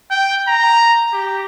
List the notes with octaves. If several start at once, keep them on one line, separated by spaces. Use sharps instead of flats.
G5
A#5
G4